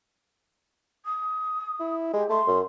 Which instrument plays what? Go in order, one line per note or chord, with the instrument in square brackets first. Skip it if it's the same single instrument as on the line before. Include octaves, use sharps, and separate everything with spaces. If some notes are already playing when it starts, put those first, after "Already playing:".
[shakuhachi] D#6
[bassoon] E4
[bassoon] G#3 [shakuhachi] G4
[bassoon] A3 [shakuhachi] C6
[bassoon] F#2